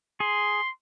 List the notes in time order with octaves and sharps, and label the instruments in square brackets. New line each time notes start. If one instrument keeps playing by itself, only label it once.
[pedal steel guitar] G#4 [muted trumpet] C6